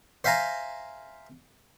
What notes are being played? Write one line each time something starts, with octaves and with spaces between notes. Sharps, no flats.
C5 E5 F5 G#5 A#5